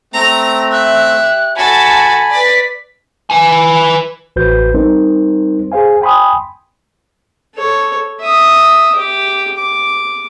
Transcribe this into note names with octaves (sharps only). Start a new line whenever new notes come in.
A3 C4 A#5
E5 F#6
G4
F#4 A4 G#5 A5 B5
B4 D5 B6
B4 G#5
A1 F#4 B4 C5 G6
G3 C4 D#4 A#4 C5
G#4 C5 F5 G#5
G5 G#5 B5 C6 D#6
A4 C#5
E5 D#6
G4 D6
D6